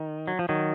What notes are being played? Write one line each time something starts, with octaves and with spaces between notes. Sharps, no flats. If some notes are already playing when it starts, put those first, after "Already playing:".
Already playing: D#3
F#3
F3
D#3 F#3